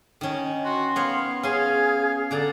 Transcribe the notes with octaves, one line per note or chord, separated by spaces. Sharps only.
D#3 C#4
F#4 C6
B3 C#5 F5
C#4 G#4 F5 G#5
D3 D4 A4 A#5